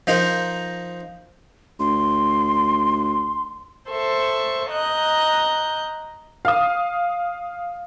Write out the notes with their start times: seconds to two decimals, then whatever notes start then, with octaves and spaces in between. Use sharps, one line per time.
0.07 F3 D#4 A#4 C5
1.80 D2 C6
3.90 A4 C5 E5 C#6
4.70 D#5 A#5 F#6 G6
6.45 F5 D#6